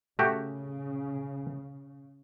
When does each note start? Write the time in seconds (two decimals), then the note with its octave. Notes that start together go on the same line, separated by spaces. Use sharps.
0.19 C#3 A3 F#4 G4